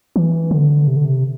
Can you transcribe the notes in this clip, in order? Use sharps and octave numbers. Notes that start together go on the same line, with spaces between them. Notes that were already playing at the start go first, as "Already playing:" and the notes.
E3
D3
C3
D3
C3